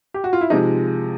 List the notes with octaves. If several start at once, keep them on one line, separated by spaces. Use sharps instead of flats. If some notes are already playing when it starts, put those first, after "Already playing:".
G4
F#4
F4
E4
C3 F3 G#3 D#4